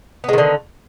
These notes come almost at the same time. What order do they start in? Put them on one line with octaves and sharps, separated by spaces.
B3 G#3 D#3 D3